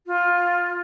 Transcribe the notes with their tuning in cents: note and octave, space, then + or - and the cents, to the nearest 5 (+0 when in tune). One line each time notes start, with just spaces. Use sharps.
F4 +10